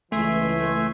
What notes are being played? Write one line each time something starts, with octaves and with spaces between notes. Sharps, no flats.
C#2 E3 A3 E5 G#5 C6